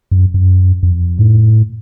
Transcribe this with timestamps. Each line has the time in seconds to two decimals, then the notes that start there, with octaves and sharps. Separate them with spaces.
0.11 F#2
0.34 F#2
0.83 F2
1.18 A2